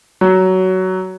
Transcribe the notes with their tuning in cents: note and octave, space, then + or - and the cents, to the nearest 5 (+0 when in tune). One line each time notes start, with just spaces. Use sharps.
F#3 +15